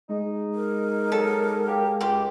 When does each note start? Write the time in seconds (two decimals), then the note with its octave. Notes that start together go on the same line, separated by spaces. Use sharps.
0.09 G#3 D#4
0.54 A#4
1.12 F#3 D#4 A4
1.67 A#3 G4
2.01 C#2 G4 C6 D6